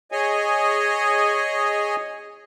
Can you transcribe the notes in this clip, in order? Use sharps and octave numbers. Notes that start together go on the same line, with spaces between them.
G#4 C#5 D#5 G#5